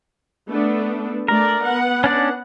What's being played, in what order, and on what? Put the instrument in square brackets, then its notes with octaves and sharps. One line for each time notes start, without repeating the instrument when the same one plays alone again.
[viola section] A3 B3 D4
[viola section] A3 D5 [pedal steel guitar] A#4
[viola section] B3 F#5
[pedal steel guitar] C#4 D4 D5